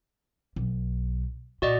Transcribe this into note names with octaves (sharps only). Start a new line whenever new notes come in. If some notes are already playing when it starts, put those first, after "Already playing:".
B1
A#2 F#4 D5 D#5